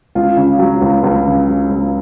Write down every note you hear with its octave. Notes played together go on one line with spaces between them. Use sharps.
C#2 F4
C#3
F#3
C#2
C#2
C#3
F#3
C#2